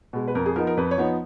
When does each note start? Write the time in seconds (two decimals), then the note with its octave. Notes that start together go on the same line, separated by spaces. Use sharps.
0.13 B2 G#3
0.28 B4
0.35 F2 A#4
0.46 G#4
0.56 F3 B3 D#4 A#4
0.67 A#4
0.77 F2 B4
0.91 C#5
0.98 F3 B3 D#4